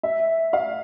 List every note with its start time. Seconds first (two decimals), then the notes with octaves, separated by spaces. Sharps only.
0.03 E5
0.53 F5